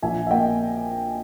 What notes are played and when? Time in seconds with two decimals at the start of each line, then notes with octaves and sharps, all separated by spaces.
0.02 A#1 E5 G#5
0.27 E5
0.31 A#3 D#5 G5